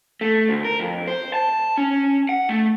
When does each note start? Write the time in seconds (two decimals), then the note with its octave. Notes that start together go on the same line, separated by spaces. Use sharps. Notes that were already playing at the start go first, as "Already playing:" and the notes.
0.21 A3
0.49 D2
0.65 A#4
0.80 F2
1.07 C5
1.34 A5
1.78 C#4
2.29 F#5
2.49 A3